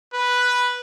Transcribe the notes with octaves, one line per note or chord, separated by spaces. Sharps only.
B4